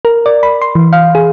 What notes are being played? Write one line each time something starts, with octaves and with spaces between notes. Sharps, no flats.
A#4
D5
B5
C6
E3
F5
G#4